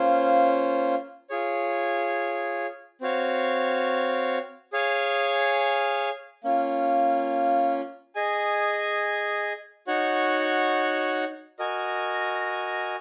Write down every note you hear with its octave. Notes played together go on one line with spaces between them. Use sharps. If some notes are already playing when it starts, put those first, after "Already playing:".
Already playing: A#3 C#4 F4 C5
F4 G#4 C#5
C4 F#4 C#5 F5
G#4 C#5 F5 G#5
A#3 C#4 F4
G#4 D#5 G#5
D#4 F#4 C#5 F#5
F#4 A#4 D#5 G#5